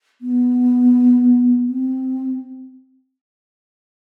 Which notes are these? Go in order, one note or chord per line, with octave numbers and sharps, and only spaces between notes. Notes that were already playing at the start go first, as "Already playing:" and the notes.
B3
C4